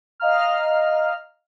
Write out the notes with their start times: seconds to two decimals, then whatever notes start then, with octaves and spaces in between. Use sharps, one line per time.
0.20 D#5 F5 A#5 F6